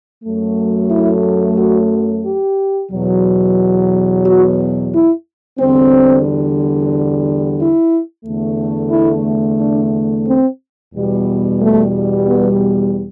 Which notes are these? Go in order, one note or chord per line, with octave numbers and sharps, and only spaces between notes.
F#2 F#3 A3
E4
F#4
G4
E2 B2 F#3
F#4
E4
E2 D3 G3 C4
E4
E2 D3 A3
E4
D4
C4
E2 B2 G3
A3
B3